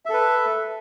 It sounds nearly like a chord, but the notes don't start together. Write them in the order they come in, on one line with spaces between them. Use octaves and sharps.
E5 A4 B4